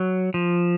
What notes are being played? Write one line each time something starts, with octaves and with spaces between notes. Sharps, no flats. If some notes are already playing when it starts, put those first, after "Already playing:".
Already playing: F#3
F3